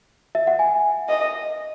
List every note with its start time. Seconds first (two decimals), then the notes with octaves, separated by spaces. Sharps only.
0.35 E5
0.47 F#5
0.59 G#5
1.09 D#5